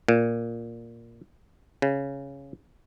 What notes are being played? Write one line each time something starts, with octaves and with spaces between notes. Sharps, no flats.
A#2
C#3